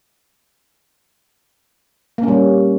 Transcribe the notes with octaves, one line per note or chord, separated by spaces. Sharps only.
G3 A#3 C#4